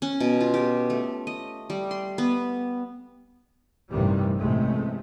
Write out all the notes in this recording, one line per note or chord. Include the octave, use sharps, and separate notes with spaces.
C#4
B2
F4
G4
A3
D#5
G3
C6
B3
A1 G2 C3 D#3 E3 G3
A1 A2 C3 G#3 A3